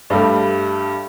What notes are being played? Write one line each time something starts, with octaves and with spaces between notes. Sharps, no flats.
G2 G3 A3